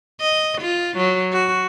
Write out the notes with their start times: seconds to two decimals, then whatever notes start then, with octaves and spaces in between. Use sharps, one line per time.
0.21 D#5
0.61 F4
0.97 F#3
1.32 F#4